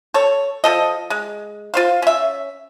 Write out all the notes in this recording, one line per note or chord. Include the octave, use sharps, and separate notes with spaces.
A4 C#5
F3 A4 D#5
G#3
F4 C5 F5
C#4 E5